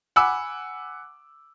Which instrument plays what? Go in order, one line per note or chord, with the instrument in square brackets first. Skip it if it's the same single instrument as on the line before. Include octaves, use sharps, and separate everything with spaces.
[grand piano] F#5 G#5 B5 D6 E6